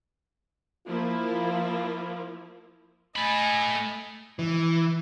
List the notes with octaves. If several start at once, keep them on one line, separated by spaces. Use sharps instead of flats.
F3 A#3 E4 F4
A3 D#5 G#5 B5
E3